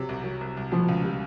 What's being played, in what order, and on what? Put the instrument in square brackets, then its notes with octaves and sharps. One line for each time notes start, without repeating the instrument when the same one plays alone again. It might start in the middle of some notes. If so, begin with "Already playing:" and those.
Already playing: [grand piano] C3 F#3
C2
F#3
C2
C2
[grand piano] B2 [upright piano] F3
[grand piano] C#2
G3